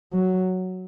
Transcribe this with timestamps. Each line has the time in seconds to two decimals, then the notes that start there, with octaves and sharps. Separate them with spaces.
0.13 F#3